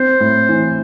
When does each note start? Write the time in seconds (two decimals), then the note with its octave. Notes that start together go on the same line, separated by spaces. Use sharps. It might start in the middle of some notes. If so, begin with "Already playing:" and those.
Already playing: C4 C5
0.20 A2
0.49 E3